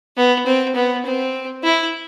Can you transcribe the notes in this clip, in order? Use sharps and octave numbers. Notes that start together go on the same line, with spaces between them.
B3
C4
B3
C4
E4